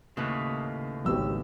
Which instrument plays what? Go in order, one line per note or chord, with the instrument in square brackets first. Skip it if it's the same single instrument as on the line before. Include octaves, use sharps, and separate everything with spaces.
[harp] D#2 A2 B4 [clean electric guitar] C#3
[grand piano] G#1 E6 [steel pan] F#3 B3 G4